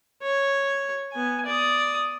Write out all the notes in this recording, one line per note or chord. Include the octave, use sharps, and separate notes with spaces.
C#5
B3 G#5
D5 D#6